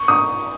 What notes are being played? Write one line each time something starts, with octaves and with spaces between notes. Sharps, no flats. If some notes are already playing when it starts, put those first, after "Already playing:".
Already playing: C#6
D#6